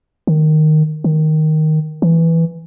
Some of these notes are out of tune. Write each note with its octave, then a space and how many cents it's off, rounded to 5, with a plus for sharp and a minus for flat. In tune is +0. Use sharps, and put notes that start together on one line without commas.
D#3 -10
D#3 +0
E3 +0